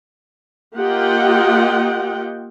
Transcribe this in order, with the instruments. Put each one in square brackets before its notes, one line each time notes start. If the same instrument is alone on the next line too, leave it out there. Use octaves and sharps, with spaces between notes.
[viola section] A#3 F4 G4 D#5 F#5 G5